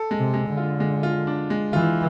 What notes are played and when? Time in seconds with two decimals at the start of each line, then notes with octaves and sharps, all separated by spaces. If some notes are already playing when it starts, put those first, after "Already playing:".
Already playing: A4
0.11 G#3
0.18 C3
0.34 G#3
0.49 D3
0.57 F4
0.80 G#3
1.03 F4
1.27 D4
1.50 G#3
1.73 E3 F4